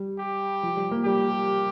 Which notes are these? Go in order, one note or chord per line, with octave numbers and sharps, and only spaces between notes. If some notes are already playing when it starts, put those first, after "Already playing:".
Already playing: G3
G4
F3
G3
A#3
G3 G4